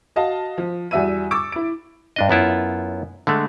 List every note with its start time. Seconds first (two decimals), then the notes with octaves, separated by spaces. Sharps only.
0.16 F#4 D#5 F5 A5
0.58 F3
0.91 E2 G3 F#4 E5 E6 D#7
1.31 C#6 D6 E6 A6 D7
1.52 E4 D7
2.16 G2 D4 D#5
2.29 F#2 B3 E4 F4
3.27 D3 G#3 A3